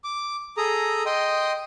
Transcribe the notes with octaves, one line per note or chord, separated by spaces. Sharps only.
D6
G#4 A4 A#5 D#6
D#5 G5 C6 D#6